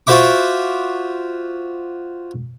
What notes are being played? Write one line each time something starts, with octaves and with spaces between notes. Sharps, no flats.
F4 F#4 C5 E5 D6